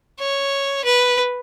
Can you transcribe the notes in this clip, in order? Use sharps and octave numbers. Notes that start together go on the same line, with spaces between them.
C#5
B4